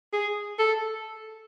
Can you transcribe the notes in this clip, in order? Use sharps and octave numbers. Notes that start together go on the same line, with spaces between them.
G#4
A4